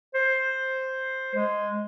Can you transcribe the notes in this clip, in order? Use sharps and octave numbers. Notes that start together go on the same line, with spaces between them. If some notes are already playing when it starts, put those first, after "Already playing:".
C5
G#3